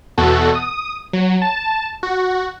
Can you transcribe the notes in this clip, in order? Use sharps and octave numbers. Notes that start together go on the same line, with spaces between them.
E2 B2 F#4 A4
D#6
F#3
A5
F#4